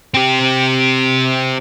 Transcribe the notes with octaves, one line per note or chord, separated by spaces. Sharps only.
C4 G4